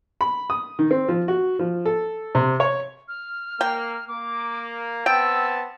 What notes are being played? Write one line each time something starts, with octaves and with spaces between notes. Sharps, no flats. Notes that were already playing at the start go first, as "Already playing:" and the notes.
B5
D#6
D#3
C4
F3
F#4
F3
A4
C3
C#5
F6
A#3 G5
A#3 D6
B3 C4 G5 A5 E6